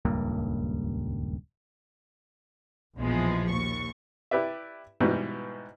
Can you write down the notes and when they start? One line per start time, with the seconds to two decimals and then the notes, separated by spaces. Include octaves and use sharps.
0.05 D#1 C#2 G2 A#3
2.96 A#1 E2 B2 F3 G#3
3.49 D#2 C#6
4.31 E4 G4 B4 D5 E5
5.00 G#2 B2 E3 G3 B3